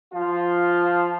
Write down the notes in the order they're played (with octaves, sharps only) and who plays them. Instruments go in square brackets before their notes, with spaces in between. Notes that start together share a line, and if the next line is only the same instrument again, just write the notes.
[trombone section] F3 F4